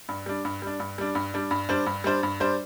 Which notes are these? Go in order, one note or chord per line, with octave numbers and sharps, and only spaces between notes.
G2
G3 D4
G2
G3 D4
G2
G3 D4
G2
G3 D4
G2
G3 D4 C5
G2
G3 D4 C5
G2
G3 D4 C5